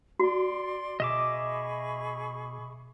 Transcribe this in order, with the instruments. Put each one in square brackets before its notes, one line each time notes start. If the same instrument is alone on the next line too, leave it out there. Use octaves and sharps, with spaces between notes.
[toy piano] F#4 [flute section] D5 C6
[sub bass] B2 [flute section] G#4 B5 C#6 [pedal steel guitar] D#5 E5 D6